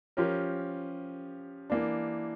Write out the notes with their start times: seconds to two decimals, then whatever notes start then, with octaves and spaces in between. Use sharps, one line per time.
0.17 F3 C#4 G4 A#4
1.70 E3 A#3 D4